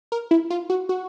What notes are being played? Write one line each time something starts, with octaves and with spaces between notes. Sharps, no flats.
A#4
E4
F4
F#4
F#4